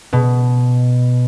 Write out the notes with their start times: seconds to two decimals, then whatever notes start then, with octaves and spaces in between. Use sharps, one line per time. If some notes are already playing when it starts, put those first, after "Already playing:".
0.13 B2